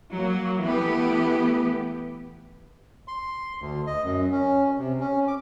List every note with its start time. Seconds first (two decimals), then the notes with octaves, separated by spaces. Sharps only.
0.12 F#3 A#3
0.61 E3 A3 B3 G4
3.08 C6
3.61 D2
3.87 D#5
4.03 F#2
4.32 C#4
4.78 C3
5.01 C#4
5.28 D6